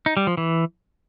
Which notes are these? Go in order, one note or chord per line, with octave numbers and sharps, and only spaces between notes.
D#4
G3
F3
E3